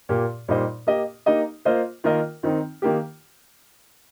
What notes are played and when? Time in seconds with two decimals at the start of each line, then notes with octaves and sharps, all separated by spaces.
0.09 A#2 A#3 G4
0.48 A#2 G3 D#4 C5 D#5
0.87 A#3 G4 D#5
1.26 A#3 D#4 G4 D#5
1.65 A#3 F4 C5 D#5
2.04 D#3 A#3 F4 A#4 D#5
2.43 D#3 C4 D#4
2.82 D#3 A#3 G4